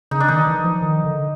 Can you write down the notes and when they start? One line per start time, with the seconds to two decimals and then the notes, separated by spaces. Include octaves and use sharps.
0.11 C#3 D#4
0.20 D4
0.28 D#3 D#4
0.47 E3
0.64 F3
0.81 D#3
1.04 D3